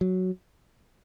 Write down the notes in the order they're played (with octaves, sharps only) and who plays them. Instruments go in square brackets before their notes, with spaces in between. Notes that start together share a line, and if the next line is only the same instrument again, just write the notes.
[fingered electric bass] F#3